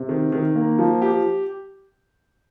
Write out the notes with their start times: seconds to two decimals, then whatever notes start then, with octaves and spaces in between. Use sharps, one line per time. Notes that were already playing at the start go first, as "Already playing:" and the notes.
Already playing: C3
0.09 D#3
0.32 D#3
0.56 A#3
0.78 F3
1.02 G4